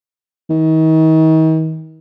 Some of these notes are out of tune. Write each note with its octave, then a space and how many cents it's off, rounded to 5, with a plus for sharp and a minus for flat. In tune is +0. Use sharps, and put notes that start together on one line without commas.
D#3 +40